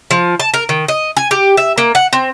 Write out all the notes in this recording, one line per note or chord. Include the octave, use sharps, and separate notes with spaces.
F3
A5
A#4
D#3
D#5
G#5
G4
E5
A#3
F#5
C4